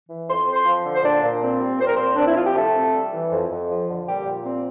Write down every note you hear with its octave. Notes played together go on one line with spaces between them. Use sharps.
E3
F2 C6
C4
C5 C6
F3
D3
C5
A#2 D4 D5
A#2
C4
G3
A#2 C5
A#4
A#2 C4 C5
C4 D4
E4
F3 F4
G4
C3 A3 A4
C4
G3
E3
F2
F2
F3
D3
A#2 G3 G4
A#2
C4